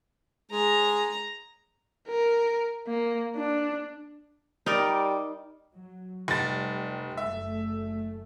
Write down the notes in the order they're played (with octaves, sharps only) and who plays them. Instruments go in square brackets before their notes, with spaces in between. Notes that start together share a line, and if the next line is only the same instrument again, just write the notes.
[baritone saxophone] G#3 [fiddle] A#5
[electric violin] A#4
A#3
D4
[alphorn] G3 [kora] D#4 A#4 D5
[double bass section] F#3
[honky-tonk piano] F1 A6 [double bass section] C3 G3
[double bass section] F#1 A3 [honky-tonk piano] E5